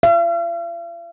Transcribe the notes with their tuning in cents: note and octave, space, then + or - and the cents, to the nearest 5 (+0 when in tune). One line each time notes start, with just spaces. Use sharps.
F5 -45